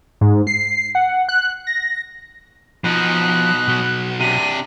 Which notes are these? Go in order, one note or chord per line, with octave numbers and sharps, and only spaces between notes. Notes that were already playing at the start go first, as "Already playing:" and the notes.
G#2
C7
F#5
F#6
A#6
B2 F3 D#4 F#6
B1 F#4
C3 D4 D#7